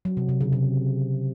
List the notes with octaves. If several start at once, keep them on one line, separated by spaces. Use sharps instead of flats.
F#3
C3
C3
C#3
C3